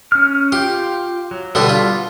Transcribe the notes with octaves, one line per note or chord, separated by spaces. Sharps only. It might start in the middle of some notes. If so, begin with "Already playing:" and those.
C#4 F6
F4 G4 G5
F#3
B2 D3 G3 F#4 G4 B4
F4